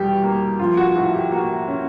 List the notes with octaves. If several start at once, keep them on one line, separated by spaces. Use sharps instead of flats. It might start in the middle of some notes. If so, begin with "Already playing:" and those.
Already playing: E2 B2 G3 G4
A#3
F3 F4
F#4
A2 F#4
G4
A#3 F#4
C#4